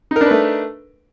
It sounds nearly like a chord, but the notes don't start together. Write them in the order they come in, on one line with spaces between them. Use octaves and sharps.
D#4 A#4 D4 B4 A3